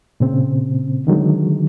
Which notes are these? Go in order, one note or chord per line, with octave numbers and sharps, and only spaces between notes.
A#2 C#3 C4
D3 D#3 F#3 G#3